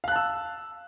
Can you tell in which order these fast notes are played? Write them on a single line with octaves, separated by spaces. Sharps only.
F5 F#6 A5 E6